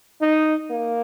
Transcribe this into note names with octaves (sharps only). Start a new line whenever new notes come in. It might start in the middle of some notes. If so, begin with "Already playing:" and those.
D#4
A#3